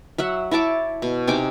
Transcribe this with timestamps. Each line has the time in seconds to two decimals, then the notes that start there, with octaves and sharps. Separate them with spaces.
0.18 F#3 E5 F#5
0.51 E4 C#5 A5 D6
1.02 B2
1.28 C3 D#4 G#5 D6